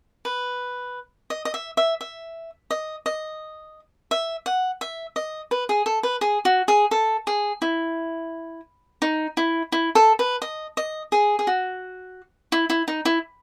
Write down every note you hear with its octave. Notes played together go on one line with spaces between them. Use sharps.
B4
D#5
D#5
E5
E5
E5
D#5
D#5
E5
F#5
E5
D#5
B4
G#4
A4
B4
G#4
F#4
G#4
A4
G#4
E4
D#4
E4
E4
A4
B4
D#5
D#5
G#4
G#4
F#4
E4
E4
D#4
E4